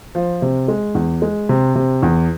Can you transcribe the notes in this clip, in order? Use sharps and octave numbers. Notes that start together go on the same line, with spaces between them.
F3
C3
G#3
E2
G#3
C3
C3
E2